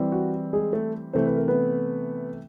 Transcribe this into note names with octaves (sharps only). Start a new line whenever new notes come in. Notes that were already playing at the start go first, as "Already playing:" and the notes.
Already playing: E3 G3 C4
F#4
G#3 G#4
A3 A4
C3 E3 A3 C5
B4
A#4
B3 B4